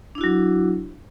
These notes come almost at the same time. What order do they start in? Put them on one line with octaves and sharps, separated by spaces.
D4 E4 F#4 F#3